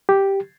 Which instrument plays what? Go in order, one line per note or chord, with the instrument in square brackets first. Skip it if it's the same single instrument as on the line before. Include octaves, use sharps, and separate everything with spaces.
[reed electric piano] G4